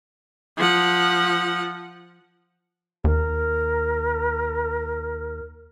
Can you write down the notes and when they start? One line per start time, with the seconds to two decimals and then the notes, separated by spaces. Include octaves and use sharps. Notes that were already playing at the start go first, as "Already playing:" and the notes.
0.57 F3 F#5
3.04 D#2 A#4